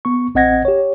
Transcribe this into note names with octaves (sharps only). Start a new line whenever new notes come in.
B3 C#6
A1 C4 D#5 F#5 G#6 A#6
G4 C#5